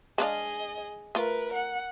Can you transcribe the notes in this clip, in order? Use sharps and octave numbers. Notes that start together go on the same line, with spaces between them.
G#3 D4 G#4 D#5 F5
A3 F4 A#4 B4
F#5